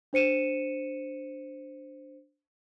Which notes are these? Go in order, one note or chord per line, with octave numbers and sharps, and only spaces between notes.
D4 C5 C#7 D#7 E7